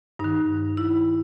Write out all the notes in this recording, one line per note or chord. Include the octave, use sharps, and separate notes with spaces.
G2 D#3 D#4
E4